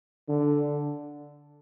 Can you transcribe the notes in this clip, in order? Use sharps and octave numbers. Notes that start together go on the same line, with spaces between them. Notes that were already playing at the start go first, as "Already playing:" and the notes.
D3